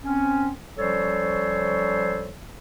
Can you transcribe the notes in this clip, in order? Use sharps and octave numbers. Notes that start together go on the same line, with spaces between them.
C4 C#4
F3 G3 C#4 A4 C5 C#5